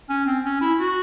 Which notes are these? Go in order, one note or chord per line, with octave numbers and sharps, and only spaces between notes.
C#4
C4
C#4
E4
F#4